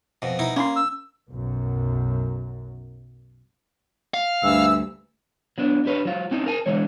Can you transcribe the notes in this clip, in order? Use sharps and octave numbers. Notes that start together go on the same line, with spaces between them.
F2 B2
B2 D#4 E4
A#3 C#4 B5 C6
E6
B1 F#2
F5
D2 G2 E3 E6
F#3 B3 D4
D4 G4 B4 C#5
F#3 F4 F#4
C4 C#4 D#4 E4
A#4 G#5 A5
D3 E3 F#3 G#3 C#5